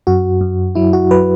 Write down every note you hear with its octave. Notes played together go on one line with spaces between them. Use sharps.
F#2 F#4
F#2
F#3 E4
F#4
F#3 B4